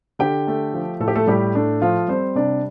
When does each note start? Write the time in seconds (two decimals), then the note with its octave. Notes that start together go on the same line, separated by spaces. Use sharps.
0.19 D3 G4 G5
0.47 A3
0.74 F3
1.00 A2 A4
1.08 G4
1.15 A3 A4
1.27 A2 G3 G4
1.54 A3 D4
1.81 F3 F4
2.08 G3 C4 C5
2.35 C3 D4 D5